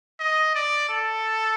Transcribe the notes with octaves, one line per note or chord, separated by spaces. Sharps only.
D#5
D5
A4